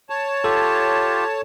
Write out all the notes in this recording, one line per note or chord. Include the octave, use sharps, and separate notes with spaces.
C#5 A5
F4 G4 A4